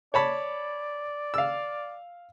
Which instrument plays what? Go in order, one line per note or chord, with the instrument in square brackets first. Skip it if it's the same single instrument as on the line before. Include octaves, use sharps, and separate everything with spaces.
[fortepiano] C#5 A5 B5 [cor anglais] D5
[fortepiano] F5 E6